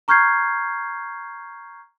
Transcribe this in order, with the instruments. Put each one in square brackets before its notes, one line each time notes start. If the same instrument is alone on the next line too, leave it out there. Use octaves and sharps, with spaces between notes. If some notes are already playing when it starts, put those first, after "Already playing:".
[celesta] A#5 C#6 F6 G6 G#6 C7